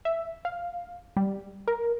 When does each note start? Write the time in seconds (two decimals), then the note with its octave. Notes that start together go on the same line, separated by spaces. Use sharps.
0.05 E5
0.45 F5
1.17 G3
1.68 A#4